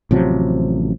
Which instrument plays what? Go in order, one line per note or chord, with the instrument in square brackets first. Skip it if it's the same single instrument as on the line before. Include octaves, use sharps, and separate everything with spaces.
[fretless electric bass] A1 C3 F3 F#3